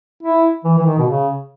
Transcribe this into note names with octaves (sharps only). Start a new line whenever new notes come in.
E4
E3
E3
D#3
B2
C#3